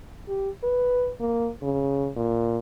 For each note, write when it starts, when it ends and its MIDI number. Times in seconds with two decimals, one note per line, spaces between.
0.28 0.49 67
0.63 1.11 71
1.20 1.49 58
1.63 2.09 49
2.16 2.59 46